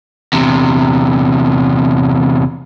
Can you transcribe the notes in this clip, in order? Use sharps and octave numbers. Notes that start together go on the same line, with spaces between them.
E2 C3